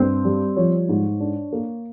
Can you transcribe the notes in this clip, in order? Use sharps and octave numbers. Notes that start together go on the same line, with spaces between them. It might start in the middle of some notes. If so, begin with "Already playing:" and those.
Already playing: G2 C4 C5
G3
F3 C#5
G#2
D4
A#3